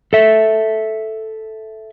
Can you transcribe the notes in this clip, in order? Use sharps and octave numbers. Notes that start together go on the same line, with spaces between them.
A4 E5